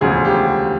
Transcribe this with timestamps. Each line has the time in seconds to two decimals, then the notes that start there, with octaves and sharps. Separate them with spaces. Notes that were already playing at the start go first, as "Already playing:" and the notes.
0.01 E1 D2 C#3 F3 G#4
0.25 G4